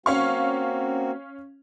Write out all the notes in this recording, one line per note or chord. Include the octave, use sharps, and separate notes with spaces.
A#3 C4 C#4 F#4 F5 C#6